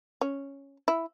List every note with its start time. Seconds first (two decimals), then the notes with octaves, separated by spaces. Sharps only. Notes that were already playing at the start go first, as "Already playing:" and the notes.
0.21 C#4
0.88 E4